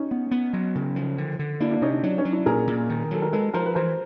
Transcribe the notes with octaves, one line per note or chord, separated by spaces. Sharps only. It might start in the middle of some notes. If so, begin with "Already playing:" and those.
Already playing: C#4 D#4
B3
B3
F#3
C#3
F3
D3
D3
A#3 D4 E4
D4 E4
C3 C#4 D#4
D4
F#3 D4
C#4 D#4
F#3
D4 E4
A#2 G#4 A#4
A#2
D#3
F#3 A4
A#4
G#3 A4 B4
F3 A#4 C5
B4
E3 A#4 C5